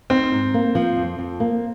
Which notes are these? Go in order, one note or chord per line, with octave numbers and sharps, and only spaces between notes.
C4 D#4
G#2
A#3
F3
F2
F2
A#3